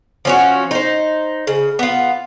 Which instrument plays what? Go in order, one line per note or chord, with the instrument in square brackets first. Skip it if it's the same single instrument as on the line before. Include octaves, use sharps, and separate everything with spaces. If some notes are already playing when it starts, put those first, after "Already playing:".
[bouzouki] F3 C#4 F#4
D#4 C5
C#3
B3 F4